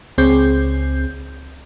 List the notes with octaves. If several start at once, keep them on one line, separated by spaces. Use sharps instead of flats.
C#2 C4 G#4 G6